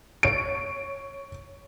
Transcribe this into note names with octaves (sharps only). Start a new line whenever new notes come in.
C#5 D7